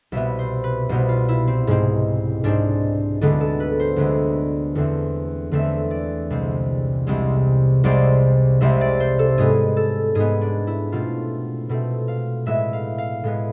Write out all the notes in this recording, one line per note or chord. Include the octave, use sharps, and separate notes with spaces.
C2 B2 B3 E5
C5
B4
C2 B2 B3 C5
F4
E4
C4
G#2 G#3 C4
G#2 G#3 C4 D4
D2 D3 G#3 B3 D4
A4
B4
C5
D2 D3 G#3 B3
E2 D3 A3 C4
E2 D3 A3 C4 E5
D5
C2 C3 G#3 C4
C2 C3 G#3 C4
C2 C3 G#3 C4 D5
C2 C3 G#3 C4 E5
D5
C5
A4
G#2 G#3 B3 G#4
A4
G#2 G#3 B3 G#4
D4
E4
B2 A3 C4 F4
B2 A3 C4
F5
A2 G#3 B3 E5
F5
F5
A2 G#3 B3